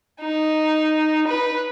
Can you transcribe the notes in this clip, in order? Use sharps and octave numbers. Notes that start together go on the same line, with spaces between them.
D#4
B4